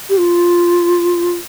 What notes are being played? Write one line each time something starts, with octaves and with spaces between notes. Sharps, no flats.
G4
F4